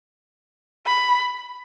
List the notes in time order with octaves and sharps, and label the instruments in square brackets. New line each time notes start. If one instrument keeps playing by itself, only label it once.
[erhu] B5